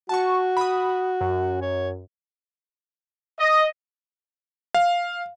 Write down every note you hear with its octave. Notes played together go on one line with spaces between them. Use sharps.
F#4 A5 C#6
B5 D#6
F#2
C#5
D#5
F5